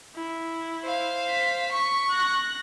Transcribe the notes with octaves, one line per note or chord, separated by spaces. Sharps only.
E4
C5 F5
B6
C#6
F#6 A#6